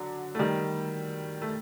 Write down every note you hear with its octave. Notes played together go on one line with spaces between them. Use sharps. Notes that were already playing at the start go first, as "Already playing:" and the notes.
Already playing: D3 F#3
A3
D#3 G3
A3